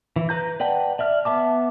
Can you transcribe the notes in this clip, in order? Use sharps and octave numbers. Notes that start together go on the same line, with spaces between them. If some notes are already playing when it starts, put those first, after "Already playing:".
E3
B4 A#5 G6
B4 D5 F#5 G5 A5
D5 E5 F6
B3 E5 A5 D6